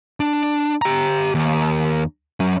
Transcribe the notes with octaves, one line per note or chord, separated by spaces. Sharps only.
D4
G4 A#5
D#2
F#3 C#4